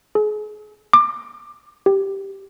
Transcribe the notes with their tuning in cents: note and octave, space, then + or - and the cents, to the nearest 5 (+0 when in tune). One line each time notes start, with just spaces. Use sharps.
G#4 +35
D6 +20
G4 -5